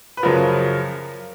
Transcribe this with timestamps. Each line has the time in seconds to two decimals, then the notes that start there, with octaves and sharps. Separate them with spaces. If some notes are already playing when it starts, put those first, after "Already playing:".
0.17 B4
0.23 F#2 C#3 F3 A#4